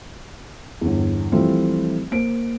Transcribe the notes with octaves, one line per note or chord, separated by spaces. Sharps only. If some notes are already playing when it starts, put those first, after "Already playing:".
G1 E2
E3 F3 G3 A3 C4 F4
A#3 C5 D7